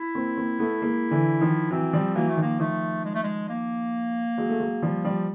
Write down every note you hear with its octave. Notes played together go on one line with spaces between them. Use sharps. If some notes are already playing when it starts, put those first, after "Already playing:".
Already playing: E4
A#3 C4
A#3 C4
A3 B3
G#3 A#3
D3 E3
D#3 F3
E3 F#3 C4
F3 G3
E3 F#3 A#3
A3
D#3 F3 A#3
D#3 F3 A3
G#3
A3
G#3
A#3
F#3 G#3
A3
F#3 G#3
F3 G3
F3 G3